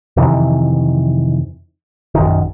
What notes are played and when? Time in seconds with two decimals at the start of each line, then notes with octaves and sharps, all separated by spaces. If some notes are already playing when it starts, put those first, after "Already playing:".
0.17 F2 C3 D#3 E3
2.15 A#1 F#2 D#3